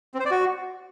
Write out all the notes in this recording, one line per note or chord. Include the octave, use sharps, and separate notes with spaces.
C4
C5
D5
F#4